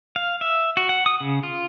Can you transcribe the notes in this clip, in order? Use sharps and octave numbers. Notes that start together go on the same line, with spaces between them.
F5
E5
F#4
F#5
D#6
C#3
F4